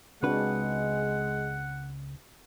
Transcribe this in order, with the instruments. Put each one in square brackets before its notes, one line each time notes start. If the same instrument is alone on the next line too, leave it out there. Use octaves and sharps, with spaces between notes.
[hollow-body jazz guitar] C#2 B4 [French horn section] G#3 [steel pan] C4 D4 F#4 [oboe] F#5